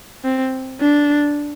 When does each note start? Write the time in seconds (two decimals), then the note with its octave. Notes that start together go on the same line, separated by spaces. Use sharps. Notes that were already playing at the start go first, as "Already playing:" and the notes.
0.24 C4
0.81 D4